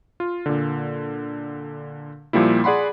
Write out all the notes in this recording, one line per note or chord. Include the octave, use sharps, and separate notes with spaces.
F4
A#2 D3
A#2 F3 G3 A#3 E4
G#4 D5 F#5 B5 C6